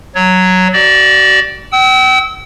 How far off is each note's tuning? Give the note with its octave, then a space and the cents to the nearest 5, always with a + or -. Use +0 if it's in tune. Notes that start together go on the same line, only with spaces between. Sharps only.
F#3 +0 C#5 +0
F#4 +45 D5 +0
G5 -45 E6 -35